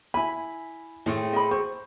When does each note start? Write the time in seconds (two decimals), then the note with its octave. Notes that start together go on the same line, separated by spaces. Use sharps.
0.14 E4 G#5 B5
1.06 A2 A3 C4 G#4
1.33 D#5 B5
1.51 C5 C#6